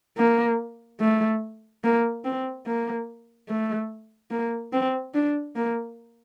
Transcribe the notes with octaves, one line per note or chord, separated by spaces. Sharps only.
A#3
A3
A#3
C4
A#3
A3
A#3
C4
D4
A#3